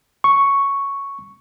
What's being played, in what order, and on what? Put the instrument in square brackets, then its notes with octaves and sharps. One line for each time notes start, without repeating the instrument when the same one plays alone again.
[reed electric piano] C#6